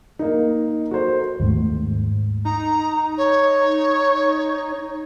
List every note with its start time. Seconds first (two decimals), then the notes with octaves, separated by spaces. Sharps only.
0.19 A#3 D#4
0.91 F#4 A4 C5
1.40 D#2 G#2 A3
2.45 D#4 A#5
3.18 C#5